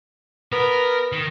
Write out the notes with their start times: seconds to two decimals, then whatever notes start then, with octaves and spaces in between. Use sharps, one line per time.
0.52 B3 A#4
1.12 D#3